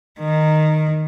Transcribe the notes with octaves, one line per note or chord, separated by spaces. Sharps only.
D#3